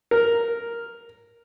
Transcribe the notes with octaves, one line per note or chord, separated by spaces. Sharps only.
A#4